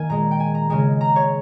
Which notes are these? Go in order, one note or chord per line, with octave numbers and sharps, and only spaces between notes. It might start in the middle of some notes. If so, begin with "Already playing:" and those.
Already playing: D#3 A#3 F5 G#5
A#2 G#3 A#5
G5
G#5
A#5
C#3 G#3 G#5
A#5
C#5